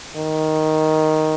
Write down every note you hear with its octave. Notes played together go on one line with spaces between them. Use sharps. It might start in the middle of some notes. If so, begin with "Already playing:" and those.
D#3